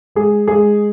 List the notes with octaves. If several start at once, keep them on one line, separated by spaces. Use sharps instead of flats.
G#3 G#4
G#3 G#4